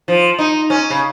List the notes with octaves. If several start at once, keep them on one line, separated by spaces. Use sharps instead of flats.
F3
D#4
C#4
C#3